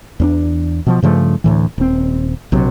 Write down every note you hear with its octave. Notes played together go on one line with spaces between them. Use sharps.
E2 C4 D4
B2 F3
G2 C#3 F3 A3
D2 A2 E3
D#1 C4
A#1 C3 F#3